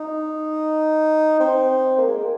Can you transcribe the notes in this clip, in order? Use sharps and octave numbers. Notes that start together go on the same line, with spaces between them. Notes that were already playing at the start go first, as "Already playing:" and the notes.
Already playing: D#4
C4
A#3
G#3
A#3